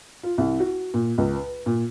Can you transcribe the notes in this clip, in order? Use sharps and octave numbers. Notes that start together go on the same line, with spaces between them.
F4
C2
F#4
A#2
C#2
B4
A#2